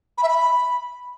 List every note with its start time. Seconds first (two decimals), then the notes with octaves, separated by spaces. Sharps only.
0.18 B5
0.23 E5
0.28 B5